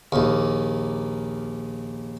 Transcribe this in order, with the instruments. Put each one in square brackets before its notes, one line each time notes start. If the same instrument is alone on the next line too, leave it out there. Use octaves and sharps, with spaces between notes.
[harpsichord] A#1 D#2